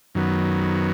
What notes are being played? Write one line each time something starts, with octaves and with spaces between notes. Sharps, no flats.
F#2 D#3 F#3 B3